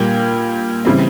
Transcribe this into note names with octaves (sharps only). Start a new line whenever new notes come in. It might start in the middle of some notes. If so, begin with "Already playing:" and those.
Already playing: A#2 G3 A#3 G5
C#3 E3 G3 C4